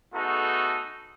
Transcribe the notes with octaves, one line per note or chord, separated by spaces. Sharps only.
A3 B3 D#4 F#4 G#4 A4